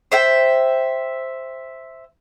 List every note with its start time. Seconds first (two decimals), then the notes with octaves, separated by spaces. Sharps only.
0.12 C5 E5 G5